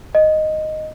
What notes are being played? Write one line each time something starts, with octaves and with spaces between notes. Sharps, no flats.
D#5